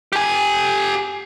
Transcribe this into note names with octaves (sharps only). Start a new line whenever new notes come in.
G4 G#5